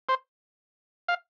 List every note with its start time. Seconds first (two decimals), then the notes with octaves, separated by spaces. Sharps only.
0.09 C5
1.08 F5